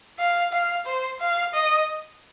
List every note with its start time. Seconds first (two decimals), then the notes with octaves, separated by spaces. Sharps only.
0.19 F5
0.53 F5
0.86 C5
1.20 F5
1.54 D#5